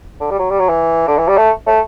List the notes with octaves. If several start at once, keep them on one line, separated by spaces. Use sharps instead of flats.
D3
G3
F#3
G3
F#3
E3
D3
E3
G3
A3
A3